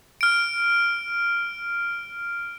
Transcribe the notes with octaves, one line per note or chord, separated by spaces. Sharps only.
F6 D7